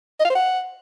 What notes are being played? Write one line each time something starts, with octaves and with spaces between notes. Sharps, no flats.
D#5
F5
C5
F#5